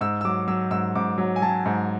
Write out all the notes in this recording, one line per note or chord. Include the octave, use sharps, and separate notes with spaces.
G#2 E6
E6
F#3 D6
F#3 E6
G#2 E6
G#2 D6
F#3
G#5
F#3 A5
G#2